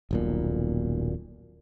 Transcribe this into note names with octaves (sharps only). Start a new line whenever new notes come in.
D#1 B1 A#2